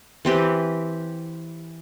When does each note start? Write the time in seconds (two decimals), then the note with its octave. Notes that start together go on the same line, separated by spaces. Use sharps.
0.25 E3 C4 G4 B4